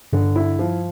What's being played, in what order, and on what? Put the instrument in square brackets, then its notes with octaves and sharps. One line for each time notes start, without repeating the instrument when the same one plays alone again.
[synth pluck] G2 [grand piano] D3
[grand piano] E4
F3